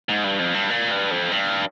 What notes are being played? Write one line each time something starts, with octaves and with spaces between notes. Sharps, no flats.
G#2
G2
F2
G2
A#2
G2
F2
G2